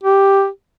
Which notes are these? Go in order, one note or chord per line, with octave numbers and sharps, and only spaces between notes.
G4